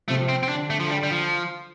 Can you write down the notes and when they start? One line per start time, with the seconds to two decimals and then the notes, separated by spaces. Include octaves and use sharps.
0.08 C3 F3 A3
0.29 C4
0.43 C4
0.49 D3 D4
0.70 A3
0.80 F3
0.90 G3
1.03 G3
1.11 F3